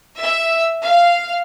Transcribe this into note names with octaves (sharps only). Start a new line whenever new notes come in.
E5
F5